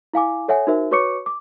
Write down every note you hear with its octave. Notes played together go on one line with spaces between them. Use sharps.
E4 F5 G#5 D6
A4 C#5 E5 F#5 G#5
D#4 F#4 A#4 C5 E5
F#4 B4 C#5 C#6 D6 C#7
D6